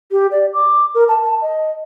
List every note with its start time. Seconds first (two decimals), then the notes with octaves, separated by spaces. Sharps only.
0.12 G4
0.31 D5
0.54 D6
0.95 A#4
1.08 A5
1.23 A5
1.42 D#5